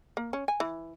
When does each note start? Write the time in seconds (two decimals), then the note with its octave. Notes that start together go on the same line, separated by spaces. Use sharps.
0.17 A#3
0.33 C#4
0.48 G#5
0.60 E3